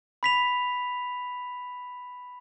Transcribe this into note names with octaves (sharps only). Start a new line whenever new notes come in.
B5 B6 F7